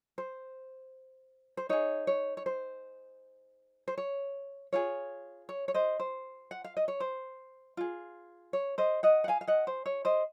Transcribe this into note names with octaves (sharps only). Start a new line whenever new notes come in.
C5
C5
D#4 G#4 C#5
C#5
C#5
C5
C5
C#5
F4 G#4 C#5
C#5
C#5
C5 D#5
C5
F#5
F5
D#5
C#5
C5
F4 G#4
C#5
C5 D#5
D#5 F#5
F#5
F5 G#5
F5
D#5 F#5
C5
C#5
C5 D#5